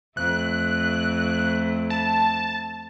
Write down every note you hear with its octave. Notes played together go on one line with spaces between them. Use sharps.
F2 A3 F#6
A5